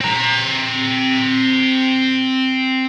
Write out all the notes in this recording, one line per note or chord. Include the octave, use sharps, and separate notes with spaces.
C4 A#5